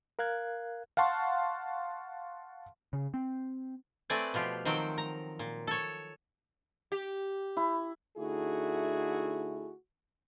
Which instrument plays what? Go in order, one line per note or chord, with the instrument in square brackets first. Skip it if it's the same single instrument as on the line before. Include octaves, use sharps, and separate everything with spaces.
[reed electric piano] A#4 F5 F#6 G#6
[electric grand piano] F5 F#5 A5 C6 C#6
[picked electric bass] C#3
C4
[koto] A3 C4 B4 D5 G#5
B2 F3 F4 G4
D#3 F3 F#3 C4 G5
A#5
A#2
A4 C#5
[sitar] G4
[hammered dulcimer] E4
[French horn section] D3 A3 D#4 E4 F#4 G#4